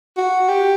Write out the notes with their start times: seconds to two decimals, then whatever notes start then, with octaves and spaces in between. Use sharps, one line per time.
0.17 F#4
0.49 G4